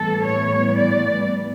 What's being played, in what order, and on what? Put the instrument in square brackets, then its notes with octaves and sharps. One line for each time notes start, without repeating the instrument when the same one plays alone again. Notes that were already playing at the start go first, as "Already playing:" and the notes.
Already playing: [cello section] A2 E3 G3 B3 A4
C#5
D5